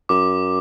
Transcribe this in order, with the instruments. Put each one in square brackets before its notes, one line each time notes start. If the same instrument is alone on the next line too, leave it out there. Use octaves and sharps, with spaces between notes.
[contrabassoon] F#2 [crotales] D6